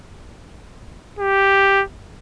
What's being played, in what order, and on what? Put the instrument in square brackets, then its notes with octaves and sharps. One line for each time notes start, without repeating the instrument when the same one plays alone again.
[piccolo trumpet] G4